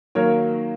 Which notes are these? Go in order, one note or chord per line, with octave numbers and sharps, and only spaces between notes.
D#3 F#3 A#3 A#4 C#5